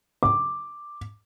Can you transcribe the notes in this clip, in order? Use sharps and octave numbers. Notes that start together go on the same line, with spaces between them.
D6